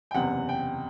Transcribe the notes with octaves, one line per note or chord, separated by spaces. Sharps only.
G5
F#1 E2 C3 F#5
G5